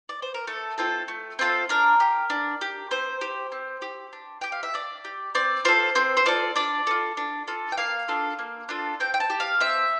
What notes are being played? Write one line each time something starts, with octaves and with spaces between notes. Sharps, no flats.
D5
C5
A#4
A3 A4
C4 F4 A4
A3
C4 F4 A4
D4 A#4
G4
D4
G4
C4 C5
G4
C4
G4
D4
G4 G5
F5
E5
D4 D5
G4
C4 D5
F4 A4 C5
C4 C5
C5
F4 A4 D5
D4 D5
F4 A4
D4
F4 A4
G5
A#3 F5
D4 F4 A4
A#3
D4 F4 A4
C4 G5
G5
A5
G4
F5
C4 E5